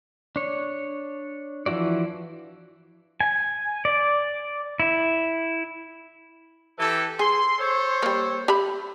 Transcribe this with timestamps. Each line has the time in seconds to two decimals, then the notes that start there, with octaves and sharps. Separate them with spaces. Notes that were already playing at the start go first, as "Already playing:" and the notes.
0.36 D4 C#5
1.66 E3 F3 E4 F#4 D5
3.21 G#5
3.85 D5
4.80 E4
6.78 E3 G4 A4
7.19 G#4 C6
7.58 A4 C5 C#5
8.02 G3 A#3
8.48 G4 E5 B5